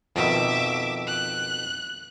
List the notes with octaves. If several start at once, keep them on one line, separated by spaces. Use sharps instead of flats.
F2 B2 D#3 E5 D6
F#6